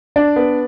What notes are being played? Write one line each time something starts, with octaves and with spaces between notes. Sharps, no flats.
D4 D5
B3